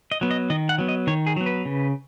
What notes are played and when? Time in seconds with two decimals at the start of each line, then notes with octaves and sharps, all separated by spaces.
0.12 D#5
0.21 F#3 B3
0.31 D#5
0.50 D#3 D#5
0.69 F#5
0.78 F#3 B3
0.88 D#5
1.07 D#3 C#5
1.26 G#4
1.36 F#3 B3
1.46 B4
1.65 C#3